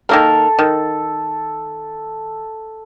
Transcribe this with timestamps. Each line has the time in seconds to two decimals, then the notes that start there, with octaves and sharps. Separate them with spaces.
0.09 D#3 A#3 A4 A#4
0.59 D#3